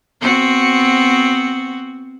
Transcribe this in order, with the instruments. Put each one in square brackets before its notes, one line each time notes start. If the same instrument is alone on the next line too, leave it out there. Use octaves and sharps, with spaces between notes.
[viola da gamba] B3 C4 F#4